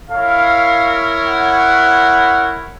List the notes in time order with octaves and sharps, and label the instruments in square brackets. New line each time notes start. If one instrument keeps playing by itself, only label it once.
[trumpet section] E4 A#4 C#5 [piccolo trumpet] F5
[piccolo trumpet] F#5